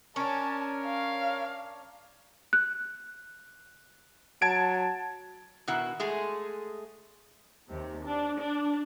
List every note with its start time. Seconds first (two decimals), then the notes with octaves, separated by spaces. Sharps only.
0.16 C#4 D4 A#4 C#5 A5
0.86 F5
2.53 F#6
4.42 F#3 A5 G#6 D7
5.68 B2 D#3 E4 F#5
6.00 G#3 A3 G#4
7.69 D#2 C3
8.05 D4
8.39 D4